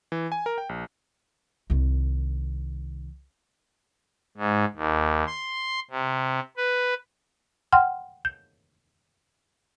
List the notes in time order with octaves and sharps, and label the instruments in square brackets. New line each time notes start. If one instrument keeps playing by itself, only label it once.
[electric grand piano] E3
G#5
A#4
G5
A#1
[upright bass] C2 D#3
[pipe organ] G#2
D#2
C6
C3
B4
[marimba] F#5 G5 C6 F6
G6